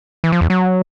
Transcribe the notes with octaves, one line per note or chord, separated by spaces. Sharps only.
E3
F3
E2
F#3